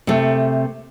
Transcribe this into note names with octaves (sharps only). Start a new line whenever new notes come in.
C3 A3